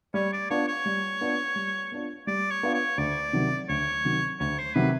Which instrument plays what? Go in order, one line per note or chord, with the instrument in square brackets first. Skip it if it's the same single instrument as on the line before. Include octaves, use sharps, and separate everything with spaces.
[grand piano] G3 [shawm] C#5
[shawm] D5
[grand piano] B3 D4 F4 [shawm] C#5
[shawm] C#5
[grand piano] G3
B3 D4 F4
G3
B3 D4 F4
[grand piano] G3 [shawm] D5
[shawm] C#5
[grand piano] B3 D4 F4
[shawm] C#5
[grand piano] D2 [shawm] D5
[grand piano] C3 D#3 F#3
[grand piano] D2 [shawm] C#5
[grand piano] C3 D#3 F#3
[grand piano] D2 [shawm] C#5
[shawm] C5
[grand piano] C3 D#3 F#3 [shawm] B4